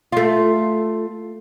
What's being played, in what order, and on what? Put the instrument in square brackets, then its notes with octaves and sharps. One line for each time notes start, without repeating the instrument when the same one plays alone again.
[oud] A3 F4